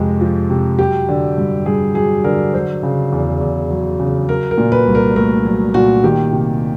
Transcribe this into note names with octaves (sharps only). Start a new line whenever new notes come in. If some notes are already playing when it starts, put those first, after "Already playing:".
Already playing: F2 C3 G#3
F3
C3
F#3 G4
D3
G2
G2 G#4
F#3 G#4
D3 A#4
F#3 C5
C#3
E2
E2
F#3
C#3
F#3 A#4
A#4
A#2
B4
C2
A#4
A3 A#4
F#3
A#2 F#4
D#3 G4
C3